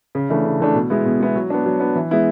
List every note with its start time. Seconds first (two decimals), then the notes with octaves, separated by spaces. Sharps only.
0.15 C#3
0.30 E3 A3 D4
0.45 C#3
0.60 E3 A3 D4
0.74 B2
0.90 G#3 B3 E4
1.05 B2
1.20 G#3 B3 E4
1.36 F#3
1.50 B3 D4
1.66 F#3
1.80 B3 D4
1.95 E3
2.11 G#3 B3 E4